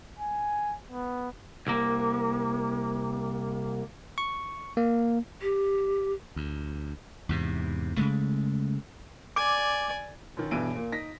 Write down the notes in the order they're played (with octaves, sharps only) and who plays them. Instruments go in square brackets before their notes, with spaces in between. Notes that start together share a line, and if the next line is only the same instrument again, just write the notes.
[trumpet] G#5
B3
[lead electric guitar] C2 A#3
[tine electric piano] C#6
A#3
[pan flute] G4
[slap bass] D2
E2 G#2 C3
C#3 G#3 A3
[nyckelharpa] D5 G#5 [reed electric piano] D6
[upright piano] F#2 D#3
B1 G2 B2 E3 D7 D#7
A#2 A#3
D#4 A#6 B6